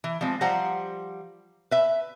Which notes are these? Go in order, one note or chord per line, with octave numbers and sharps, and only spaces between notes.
E3
F3 G3 G#3 C4
F3 G3 C5 F#5 A#5
B4 E5